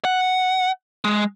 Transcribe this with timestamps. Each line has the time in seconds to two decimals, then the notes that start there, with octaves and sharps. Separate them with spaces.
0.05 F#5
1.05 G#3